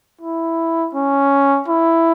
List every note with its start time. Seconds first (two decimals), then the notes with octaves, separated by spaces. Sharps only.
0.21 E4
0.94 C#4
1.68 E4